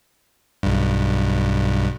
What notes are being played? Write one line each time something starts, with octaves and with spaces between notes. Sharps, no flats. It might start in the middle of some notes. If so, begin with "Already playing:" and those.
B1 G2